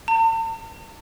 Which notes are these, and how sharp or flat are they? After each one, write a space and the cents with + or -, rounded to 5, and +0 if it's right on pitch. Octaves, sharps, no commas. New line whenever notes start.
A5 +45